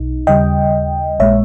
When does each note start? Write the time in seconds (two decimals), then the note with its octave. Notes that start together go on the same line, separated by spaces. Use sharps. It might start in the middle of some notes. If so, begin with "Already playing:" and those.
Already playing: B1 B2 D#4
0.27 D#2 C#3 G3 D#5 G5
1.19 A#1 A#2 G#3 C#5 E5